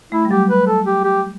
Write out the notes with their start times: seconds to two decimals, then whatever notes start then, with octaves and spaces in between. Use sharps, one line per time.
0.12 A3 E4
0.25 G3
0.31 F#3 G4
0.50 B4
0.67 A4
0.86 G4
1.04 G4